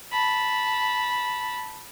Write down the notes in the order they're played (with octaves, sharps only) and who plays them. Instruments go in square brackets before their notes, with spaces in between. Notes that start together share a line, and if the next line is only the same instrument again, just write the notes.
[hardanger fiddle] A5 B5